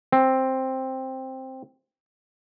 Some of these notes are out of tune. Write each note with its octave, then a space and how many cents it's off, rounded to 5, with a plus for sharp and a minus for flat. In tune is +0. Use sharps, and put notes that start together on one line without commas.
C4 +5